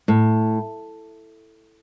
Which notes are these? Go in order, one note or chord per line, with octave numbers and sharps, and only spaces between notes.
A2